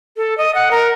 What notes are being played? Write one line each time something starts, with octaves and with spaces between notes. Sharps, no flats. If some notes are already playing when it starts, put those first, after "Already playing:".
A4
D#5
F#5
A#4